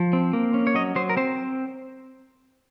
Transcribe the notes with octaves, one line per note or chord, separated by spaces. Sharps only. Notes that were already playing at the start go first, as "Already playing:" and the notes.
Already playing: F3
C4
A#3
C#4
C#5
F#3 D#5
F#3 C5
A#4
C4 C5